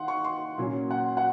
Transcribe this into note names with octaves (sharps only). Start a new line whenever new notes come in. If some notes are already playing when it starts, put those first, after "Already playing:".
Already playing: D#3 F5 F#5 C6
C#6
C6
A#2 F#3 C#4
F#5
F#5